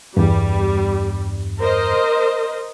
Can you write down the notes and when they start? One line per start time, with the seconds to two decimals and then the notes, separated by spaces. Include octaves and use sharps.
0.17 E2 G2 G3
1.60 A#4 C5 D#5